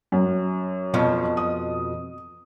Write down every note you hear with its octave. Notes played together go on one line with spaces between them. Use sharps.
F#2
F2 B2 F3
D#6